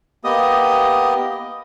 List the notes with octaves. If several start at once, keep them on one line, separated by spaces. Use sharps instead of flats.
A#3 B3 G4 D#5 D#6